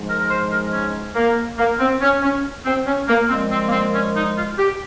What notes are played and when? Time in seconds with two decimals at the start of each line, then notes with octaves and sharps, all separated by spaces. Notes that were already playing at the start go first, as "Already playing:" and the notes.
Already playing: G#2 F3 G#3
0.09 A#4
0.20 A#4
0.30 C5
0.52 A#4
0.73 C#4
1.16 A#3
1.58 A#3
1.80 C4
2.01 C#4
2.23 C#4
2.66 C4
2.86 C#4
3.08 A#3
3.29 A#2 F3 G#3 C4
3.51 C4
3.67 A#3
3.72 C4
3.94 C#4
4.15 D#4
4.36 F4
4.58 G4